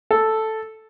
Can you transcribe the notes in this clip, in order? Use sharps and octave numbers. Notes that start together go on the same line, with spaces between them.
A4